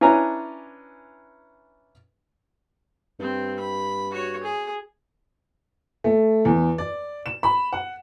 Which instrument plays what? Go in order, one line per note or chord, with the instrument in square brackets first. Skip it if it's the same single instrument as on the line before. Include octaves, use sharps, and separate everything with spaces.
[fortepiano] C#4 D4 E4 B4 G#5 A#5
[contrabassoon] G2 [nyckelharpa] C4
[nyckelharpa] B5
F#4 C#5
G#4
[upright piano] A3
E2
D5
E7
B5
F#5